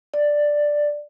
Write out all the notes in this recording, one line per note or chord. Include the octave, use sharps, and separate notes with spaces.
D5